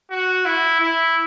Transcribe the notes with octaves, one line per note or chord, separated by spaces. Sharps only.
F#4
E4
E4